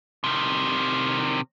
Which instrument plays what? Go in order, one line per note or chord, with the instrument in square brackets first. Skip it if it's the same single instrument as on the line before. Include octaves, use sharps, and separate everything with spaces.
[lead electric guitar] C3 D#3